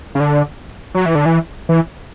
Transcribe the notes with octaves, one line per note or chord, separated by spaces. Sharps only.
C#3
D3
F#3
E3
D3
E3
E3